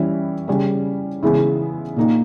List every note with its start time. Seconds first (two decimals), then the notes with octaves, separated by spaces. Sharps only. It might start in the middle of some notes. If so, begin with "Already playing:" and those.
Already playing: E3 G3 C#4 E4
0.48 C#3 G3 C#4
1.23 C#3 E3 G#3 B3 E4
1.96 A#2 A#3 D#4